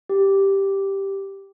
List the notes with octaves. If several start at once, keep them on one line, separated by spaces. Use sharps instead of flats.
G4